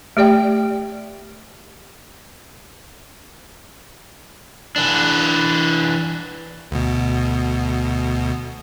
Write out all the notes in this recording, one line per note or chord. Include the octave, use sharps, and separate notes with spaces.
A3 G4 D5 G5
E3 D4
D2 B2